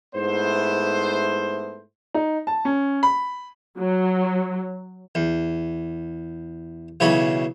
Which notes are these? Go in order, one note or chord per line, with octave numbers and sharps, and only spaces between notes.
G#2 A3 B3 E4 C5
D#4
A5
C#4
B5
F#3
E2
B1 C#3 E3 F#3 C#4 B5